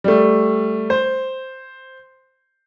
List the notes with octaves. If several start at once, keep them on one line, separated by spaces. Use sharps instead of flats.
G3 A3
C5